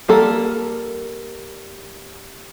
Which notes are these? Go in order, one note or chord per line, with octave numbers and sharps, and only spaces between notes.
G3 A#3 A4 A#4